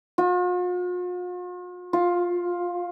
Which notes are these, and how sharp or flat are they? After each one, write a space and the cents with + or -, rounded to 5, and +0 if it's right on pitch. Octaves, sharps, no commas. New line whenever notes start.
F4 +45
F4 +10